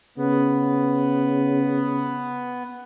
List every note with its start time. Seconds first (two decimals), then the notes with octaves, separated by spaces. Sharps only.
0.18 C#3 B3